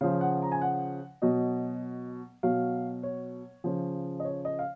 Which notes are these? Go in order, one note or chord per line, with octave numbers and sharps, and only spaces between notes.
C#3 F3 F5
F#5
A#5
G#5
F#5
B2 F#3 D#5
B2 F#3 F5
C#5
C#3 F3
D#5
C#5
D#5
F5